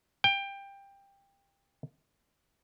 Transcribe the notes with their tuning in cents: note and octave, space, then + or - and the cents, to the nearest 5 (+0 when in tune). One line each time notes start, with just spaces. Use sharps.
G5 +20